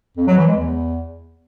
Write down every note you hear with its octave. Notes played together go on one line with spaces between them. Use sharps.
F2
F#3
E3
G#3
E2